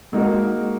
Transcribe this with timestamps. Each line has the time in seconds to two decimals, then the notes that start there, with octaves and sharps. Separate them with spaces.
0.13 G#3 A#3 D#4 F#4 A#4